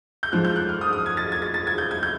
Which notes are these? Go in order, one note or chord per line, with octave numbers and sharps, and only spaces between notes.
G6
G#2 F3 F#6
G6
F#6
F6
D#6
D#6
G#6
A6
G#6
A6
A6
G#6
G6
G#6
G6